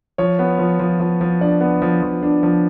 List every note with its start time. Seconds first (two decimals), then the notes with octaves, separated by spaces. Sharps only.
0.18 F3 C#5
0.39 B3
0.59 F3
0.79 F3
1.00 F3
1.21 F3
1.41 D4 D5
1.61 B3
1.82 F3
2.02 F3
2.23 D4
2.43 F3